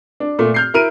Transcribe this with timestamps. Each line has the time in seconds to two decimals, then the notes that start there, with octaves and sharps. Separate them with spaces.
0.20 D4
0.39 A#2 A3
0.54 F6 G6 C7
0.74 E4 A#4 F6 D7 D#7